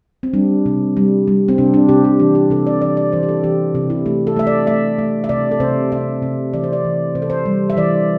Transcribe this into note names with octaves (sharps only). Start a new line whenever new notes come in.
C4
G3 D4
C3
G3
G3
C4
C3 D4
D4
C3 G4
D4
E3 D4
G4
C3 A4
D5
E3 D5
D5
E3 C5
G4
A4
E3 G4
C3
E4
A3 G4
A4
A3 E5
D5
A3 E5
A3
E5
C3 D5
A4
C3 C5
C3 E5
C3
E3 D5
C5
D5
E3
C3 C5
A4
C5
G3
E5
E3 D5